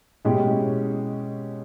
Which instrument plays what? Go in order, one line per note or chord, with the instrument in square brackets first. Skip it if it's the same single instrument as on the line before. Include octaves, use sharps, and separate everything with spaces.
[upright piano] B2 G#3 C#4 E4 G4